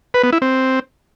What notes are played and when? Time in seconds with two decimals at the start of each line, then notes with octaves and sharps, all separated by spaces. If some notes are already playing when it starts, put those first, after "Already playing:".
0.14 B4
0.23 B3
0.33 E4
0.42 C4